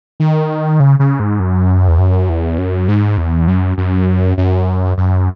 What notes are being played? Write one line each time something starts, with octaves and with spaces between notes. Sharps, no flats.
D#3
C#3
C#3
G#2
F#2
E2
F#2
E2
F#2
G#2
E2
F#2
F#2
F#2
F#2